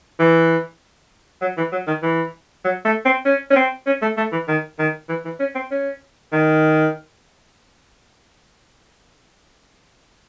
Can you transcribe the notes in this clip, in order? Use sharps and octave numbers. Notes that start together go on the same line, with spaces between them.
E3
F#3
E3
F#3
D#3
E3
F#3
A3
C4
C#4
C#4
C4
C#4
A3
A3
E3
D#3
D#3
E3
E3
C#4
C4
C#4
D#3